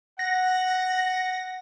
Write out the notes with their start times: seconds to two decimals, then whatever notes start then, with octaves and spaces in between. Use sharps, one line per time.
0.19 F#5 A#6